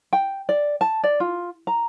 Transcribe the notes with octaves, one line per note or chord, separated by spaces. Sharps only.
G5
D5
A5
D5
F4
A#5